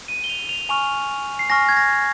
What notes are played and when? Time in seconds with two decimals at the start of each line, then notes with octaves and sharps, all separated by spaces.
0.08 D#7
0.24 G7
0.29 F7
0.49 F7
0.69 G#5 C#6 F6 F7
1.39 C7
1.50 G#5 C#6 F6 A#6
1.69 G#6
1.77 A#6